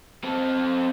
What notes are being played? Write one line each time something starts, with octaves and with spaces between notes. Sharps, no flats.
C4 A4